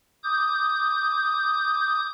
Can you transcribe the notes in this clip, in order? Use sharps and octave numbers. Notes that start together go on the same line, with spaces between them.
D6 D#6 G6